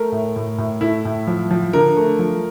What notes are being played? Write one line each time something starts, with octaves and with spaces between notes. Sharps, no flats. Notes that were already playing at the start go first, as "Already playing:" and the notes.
Already playing: A3 A#4
A2
A2
A2
A3 E4
A2
F3
F3
D3 A#4
A3
F3